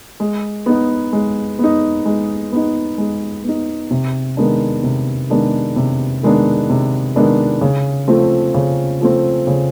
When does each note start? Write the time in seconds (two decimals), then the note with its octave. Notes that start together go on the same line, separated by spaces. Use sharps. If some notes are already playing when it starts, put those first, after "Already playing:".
0.20 G#3
0.66 B3 D#4
1.13 G#3
1.59 B3 D#4
2.05 G#3
2.52 B3 D#4
2.98 G#3
3.44 B3 D#4
3.91 C3
4.37 D#3 G#3 B3 D4
4.83 C3
5.30 D#3 G#3 B3 D4
5.76 C3
6.23 D#3 G#3 B3 D4
6.70 C3
7.16 D#3 G#3 B3 D4
7.61 C#3
8.08 F3 A3 C4
8.54 C#3
9.01 F3 A3 C4
9.47 C#3